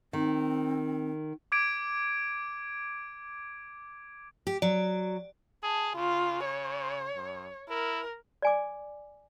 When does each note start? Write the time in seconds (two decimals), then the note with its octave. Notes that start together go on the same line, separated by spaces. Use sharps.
0.13 D#3 C4
1.52 D6 G#6 D7
4.47 G4
4.62 F#3 D5
5.64 G#4 A5
5.96 C#3 F4
6.45 C#5
7.16 F#2
7.69 E4 A#4
8.42 D5 G#5 D6